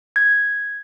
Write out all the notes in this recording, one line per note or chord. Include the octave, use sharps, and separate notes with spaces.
G#6